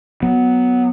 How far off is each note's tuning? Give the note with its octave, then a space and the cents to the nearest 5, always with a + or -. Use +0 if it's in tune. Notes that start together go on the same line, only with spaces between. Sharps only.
F#3 +0 B3 +0